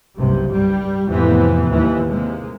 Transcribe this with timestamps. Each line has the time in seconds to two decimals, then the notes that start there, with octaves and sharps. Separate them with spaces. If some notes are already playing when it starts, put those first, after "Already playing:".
0.18 F#1 C2 G2 C3
0.51 G2 G3
1.09 F2 A2 C3 E3 B3
1.70 D#2 E3
2.07 C3 G#3 A#3